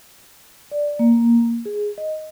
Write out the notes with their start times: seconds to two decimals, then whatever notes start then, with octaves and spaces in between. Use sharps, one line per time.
0.71 D5
0.99 A#3
1.66 G#4
1.98 D#5